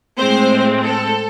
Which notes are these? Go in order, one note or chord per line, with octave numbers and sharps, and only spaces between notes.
A2 G#3 C4 C5
A4